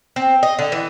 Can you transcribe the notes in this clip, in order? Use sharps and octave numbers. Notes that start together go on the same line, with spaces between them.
C4
D#5
D3
E3